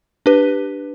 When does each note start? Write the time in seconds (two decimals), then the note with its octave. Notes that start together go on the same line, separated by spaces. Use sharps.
0.26 D4 G4 B4